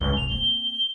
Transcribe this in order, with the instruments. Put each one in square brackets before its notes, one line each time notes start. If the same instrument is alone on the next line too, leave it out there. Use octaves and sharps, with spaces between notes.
[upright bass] C#2 D3 [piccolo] G7
[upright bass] C2 B2 [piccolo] F7
[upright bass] A#3 C4 [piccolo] G7